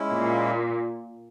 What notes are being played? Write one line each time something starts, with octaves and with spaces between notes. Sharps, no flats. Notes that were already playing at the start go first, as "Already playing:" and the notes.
Already playing: G#3 C#4 E4
A#2